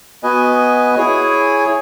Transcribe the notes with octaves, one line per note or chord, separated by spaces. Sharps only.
B3 F#4 B4 D#5 G#5
E4 G#4 C#5 G#5